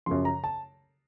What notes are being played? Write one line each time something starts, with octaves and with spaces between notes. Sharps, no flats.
F#2 C#3 F3 C6
A#5
A5